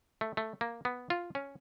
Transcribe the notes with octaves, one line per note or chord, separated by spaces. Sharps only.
A3
A3
A#3
B3
F4
C#4